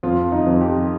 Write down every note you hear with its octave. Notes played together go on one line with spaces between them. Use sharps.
F2 F4
D#4
F2
G4